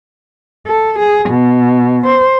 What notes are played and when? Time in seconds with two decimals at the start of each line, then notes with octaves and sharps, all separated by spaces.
0.67 A4
0.99 G#4
1.30 B2
2.07 C5